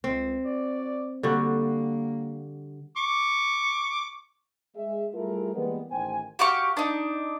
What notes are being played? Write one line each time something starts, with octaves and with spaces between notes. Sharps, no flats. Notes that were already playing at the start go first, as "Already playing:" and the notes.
C#2 C4
F#4 C#5 D5
D3 G3 A#3 F#4
C#6 D6
G#3 G#4 E5
G3 A3 E4 F4 G#4 A#4
E3 G3 G#3 A#3 B3
A1 D#3 C5 G5 G#5
F#4 G4 F5 C#6
D4 D#4